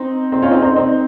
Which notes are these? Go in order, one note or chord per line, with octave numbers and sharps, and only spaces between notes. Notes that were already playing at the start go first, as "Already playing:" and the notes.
Already playing: C4 D#4
C4 D#4
C#4 F4
C4 D#4
C4 D#4
C4 D#4